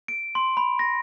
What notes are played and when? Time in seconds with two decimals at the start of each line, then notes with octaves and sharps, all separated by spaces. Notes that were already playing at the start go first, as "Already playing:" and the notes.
0.08 D7
0.35 C6
0.57 B5
0.79 A#6